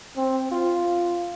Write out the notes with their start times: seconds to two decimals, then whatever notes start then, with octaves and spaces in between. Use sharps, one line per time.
0.17 C4
0.51 F4